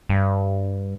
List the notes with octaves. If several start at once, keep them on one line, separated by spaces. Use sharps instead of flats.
G2